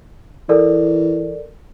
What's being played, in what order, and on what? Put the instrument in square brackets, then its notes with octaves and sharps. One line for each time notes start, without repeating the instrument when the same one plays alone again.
[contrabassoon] E3 [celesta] A4 A#4 D5